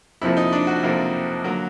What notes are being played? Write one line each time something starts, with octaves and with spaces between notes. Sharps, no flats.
F2 C3 F3 A#3 E4
D#4
D4
F#4
F2 C3 F3 A#3
D3 F#3 A#3